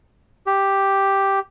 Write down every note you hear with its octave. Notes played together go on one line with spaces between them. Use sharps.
G4